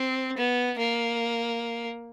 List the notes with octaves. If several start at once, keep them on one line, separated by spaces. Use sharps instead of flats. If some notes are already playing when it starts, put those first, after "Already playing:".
Already playing: C4
B3
A#3